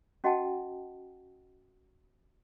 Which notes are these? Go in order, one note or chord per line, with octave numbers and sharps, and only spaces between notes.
C#4 F#4 D#5 F#5 G5 A5